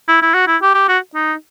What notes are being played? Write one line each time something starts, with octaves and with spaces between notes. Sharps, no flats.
E4
E4
F#4
E4
G4
G4
F#4
D#4